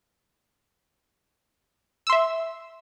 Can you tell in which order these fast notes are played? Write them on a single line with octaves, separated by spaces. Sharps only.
E6 C6 E5